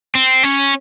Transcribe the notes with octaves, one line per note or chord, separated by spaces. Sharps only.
C4
C#4